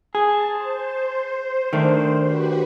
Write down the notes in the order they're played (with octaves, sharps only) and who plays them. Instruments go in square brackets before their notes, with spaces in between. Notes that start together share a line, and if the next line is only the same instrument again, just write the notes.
[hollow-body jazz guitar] G#4 [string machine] A5
[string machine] C5
[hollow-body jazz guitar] D#3 A3 D4
[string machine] F#4 G4 B4